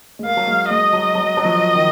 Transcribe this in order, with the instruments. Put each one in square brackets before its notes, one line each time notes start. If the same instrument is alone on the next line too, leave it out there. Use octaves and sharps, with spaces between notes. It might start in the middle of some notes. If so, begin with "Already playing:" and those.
[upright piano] G#3
[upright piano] A#3 [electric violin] F5
[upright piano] F#3
G#3
[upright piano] G#3 [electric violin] D#5
[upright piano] F#3
F#3
F#3
F3
D#3